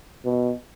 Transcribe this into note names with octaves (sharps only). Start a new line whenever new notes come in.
B2